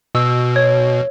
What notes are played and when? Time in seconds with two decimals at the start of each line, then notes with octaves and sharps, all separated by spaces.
0.15 B2 E6
0.56 C#5